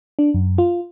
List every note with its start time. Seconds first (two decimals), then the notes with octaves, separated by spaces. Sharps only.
0.19 D4
0.34 F#2
0.58 F4